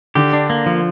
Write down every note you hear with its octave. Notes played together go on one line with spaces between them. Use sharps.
D3 G4
D4
A#3
F3